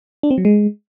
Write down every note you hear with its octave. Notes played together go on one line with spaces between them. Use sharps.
D4
C4
F#3
G#3